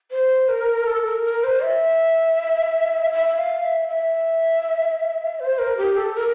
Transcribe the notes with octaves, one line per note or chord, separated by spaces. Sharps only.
C5
A#4
A4
A#4
A#4
C5
E5
E5
F5
E5
E5
C5
A#4
G4
A4
A#4